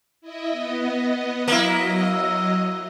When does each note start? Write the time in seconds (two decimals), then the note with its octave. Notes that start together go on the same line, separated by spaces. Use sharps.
0.21 E4 D#5 E5
0.50 B3 D#5
1.48 F#3 A#3 E4 D#5